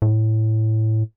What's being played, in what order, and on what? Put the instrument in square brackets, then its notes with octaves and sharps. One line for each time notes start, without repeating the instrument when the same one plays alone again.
[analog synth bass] A2